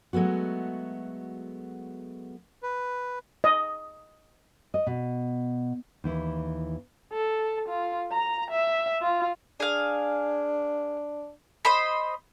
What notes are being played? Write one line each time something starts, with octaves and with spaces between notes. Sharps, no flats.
F#3 G#3 A3 B3 F#4
B4
D#5
D#5
B2
D#2 E3 E4
A4
F4
A#5
E5
F4
D4 G#4 F5
C5 D#5 B5